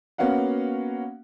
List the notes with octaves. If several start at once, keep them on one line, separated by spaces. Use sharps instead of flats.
A#3 B3 C#4 F#4 F5 F#5